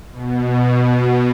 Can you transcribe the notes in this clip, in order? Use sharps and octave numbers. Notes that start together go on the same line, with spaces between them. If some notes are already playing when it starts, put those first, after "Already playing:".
B2